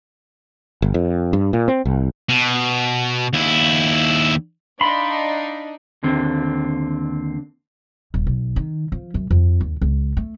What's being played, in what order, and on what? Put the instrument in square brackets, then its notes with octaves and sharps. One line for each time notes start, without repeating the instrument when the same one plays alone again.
[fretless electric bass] G1
F2
G2
A#2
C4
C2
[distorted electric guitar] B2
D#2 E4
[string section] D4 D#4 [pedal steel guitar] F5 B5 C6
[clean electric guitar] D#2 D3 C4
[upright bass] D#1
B1
D#3
F3
F#2
F2
D#2
C#2
A3